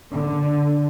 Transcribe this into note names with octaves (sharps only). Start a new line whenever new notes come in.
D3